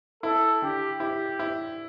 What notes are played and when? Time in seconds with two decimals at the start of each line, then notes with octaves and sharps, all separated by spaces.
0.23 E4 A4
0.62 D3 G4
1.00 E4 G4
1.39 E4